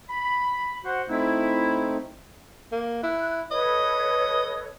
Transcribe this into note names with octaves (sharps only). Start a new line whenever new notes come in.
B5
F#4 C5 F#5
A3 C4 D#4 E4
A#3
E4 F#6
A4 B4 C#5 D#5